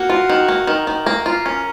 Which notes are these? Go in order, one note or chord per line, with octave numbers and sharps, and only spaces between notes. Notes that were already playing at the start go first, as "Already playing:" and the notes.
Already playing: A#3 F#4
F4
D#3
A#3
D#3 A#4
D#3
A#3
F4
C#4